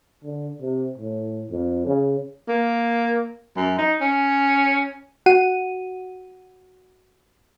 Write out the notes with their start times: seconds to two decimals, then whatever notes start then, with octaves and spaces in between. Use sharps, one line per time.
0.24 D3
0.62 C3
0.98 A2
1.51 F2
1.87 C#3
2.48 A#3
3.56 F#2
3.78 D#4
4.01 C#4
5.26 F#4 F#5 D#7